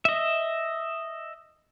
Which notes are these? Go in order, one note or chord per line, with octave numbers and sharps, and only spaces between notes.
D#5 E5